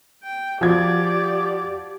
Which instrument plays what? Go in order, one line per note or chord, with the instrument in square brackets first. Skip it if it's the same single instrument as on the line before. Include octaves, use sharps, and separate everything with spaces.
[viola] G5
[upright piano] F3 F#4 G#6 [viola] G4 D5